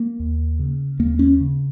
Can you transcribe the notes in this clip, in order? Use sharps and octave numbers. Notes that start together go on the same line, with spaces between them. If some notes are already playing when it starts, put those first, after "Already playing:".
Already playing: A#3
D#2
C#3
D#2 A#3
C#4
C#3